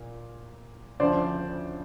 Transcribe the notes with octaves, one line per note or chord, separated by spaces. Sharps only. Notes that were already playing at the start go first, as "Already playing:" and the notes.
Already playing: A#2
D2 C#3 F3 C5 D5